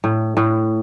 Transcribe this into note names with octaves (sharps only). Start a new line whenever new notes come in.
A2
A2